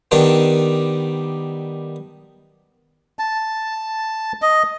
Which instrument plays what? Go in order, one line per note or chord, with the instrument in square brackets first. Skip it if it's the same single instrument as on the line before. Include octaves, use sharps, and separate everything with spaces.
[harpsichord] D#3 G3 B3 D4
[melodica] A5
D#5